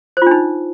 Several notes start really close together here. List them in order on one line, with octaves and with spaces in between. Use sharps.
C5 F4 D4 D#4